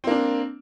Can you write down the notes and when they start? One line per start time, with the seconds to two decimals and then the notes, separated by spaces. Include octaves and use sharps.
0.04 C4
0.07 A#3
0.11 D4